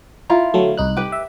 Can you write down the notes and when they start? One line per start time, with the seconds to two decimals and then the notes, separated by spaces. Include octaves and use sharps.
0.30 E4 F4 A#5
0.54 D3 F#3 A3
0.77 C2 D#4 F#6
0.97 G4 B4
1.12 E5